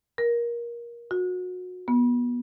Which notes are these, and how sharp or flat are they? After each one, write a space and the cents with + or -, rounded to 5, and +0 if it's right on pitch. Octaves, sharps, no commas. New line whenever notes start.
A#4 +20
F#4 -30
B3 -25